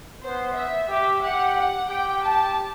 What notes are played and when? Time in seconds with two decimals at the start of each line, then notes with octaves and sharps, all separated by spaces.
0.22 B3 C5
0.56 E5
0.89 G4 E5
1.23 G4 F#5
1.57 F#5
1.90 G4 G5
2.23 A5